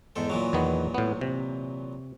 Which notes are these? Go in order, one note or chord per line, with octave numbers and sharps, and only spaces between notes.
E2 G#2 A4
A#2 E3 F#3
E2 D#3 B3
A2 B3
C3